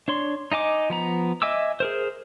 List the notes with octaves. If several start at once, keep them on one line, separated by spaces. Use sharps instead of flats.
D4 C#5 C6
D#4 D#5 G#5 D6
F3 B3 A#5
D#5 E5 G#5 D6 E6
G#4 A#4 C5